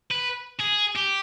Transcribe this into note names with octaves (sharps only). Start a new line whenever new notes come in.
B4
G#4
G4